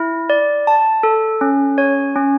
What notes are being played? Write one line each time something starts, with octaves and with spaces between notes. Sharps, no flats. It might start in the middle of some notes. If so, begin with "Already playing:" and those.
Already playing: E4
D5
A5
A4
C#4
C#5
C#4